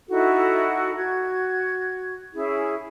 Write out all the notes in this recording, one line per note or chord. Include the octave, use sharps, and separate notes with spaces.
D#4 E4 F#4 A4
F#4 G#6
C#4 E4 G#4